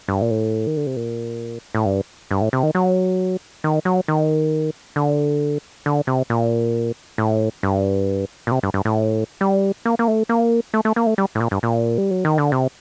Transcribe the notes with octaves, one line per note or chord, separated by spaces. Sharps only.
G2
A#2
A2
D#3
D3
C3
A#2
A2
G2
G2
A2
C3
D#3
F#3
D#3
F#3
D#3
D3
D3
C3
A#2
A2
G2
A#2
C3
G2
G2
A2
G3
A#3
A#3
A3
A#3
A3
A3
A#3
A3
G3
A2
A#2
G2
A#2
G3
F#3
D#3
D3
C3